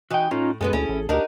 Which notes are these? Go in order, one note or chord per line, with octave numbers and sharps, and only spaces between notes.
E3 D#4 F#4 G5
A2 C#4 D#4 F4
F#2 G#3 B3 G#4 A4 B4
D2 C#4 E4
A1
D2 D4 D#4 F#4 G4 A#4